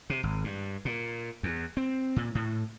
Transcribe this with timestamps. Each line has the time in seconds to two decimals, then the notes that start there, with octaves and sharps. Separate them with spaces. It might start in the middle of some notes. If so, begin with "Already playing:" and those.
0.10 C3
0.23 G#1
0.44 G2
0.85 A#2
1.43 E2
1.77 C4
2.16 A#2
2.35 A2